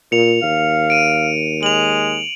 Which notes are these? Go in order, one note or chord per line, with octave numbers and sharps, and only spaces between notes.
A#2 C#7 F7
D#2 F5
D7 D#7
G#3 F7 F#7